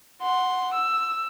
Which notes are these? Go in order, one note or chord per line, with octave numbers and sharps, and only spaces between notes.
F#5 C6
E6